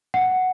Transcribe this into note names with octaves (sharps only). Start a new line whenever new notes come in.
F#5